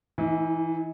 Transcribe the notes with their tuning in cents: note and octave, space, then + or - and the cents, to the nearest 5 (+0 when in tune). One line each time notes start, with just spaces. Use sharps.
E3 +0 D#4 +45